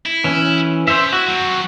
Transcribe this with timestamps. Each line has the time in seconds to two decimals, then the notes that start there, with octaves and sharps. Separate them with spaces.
0.06 E4
0.24 E3 C#4
0.88 C#3 C5 E5
1.13 E4 F#4
1.28 F#3 C4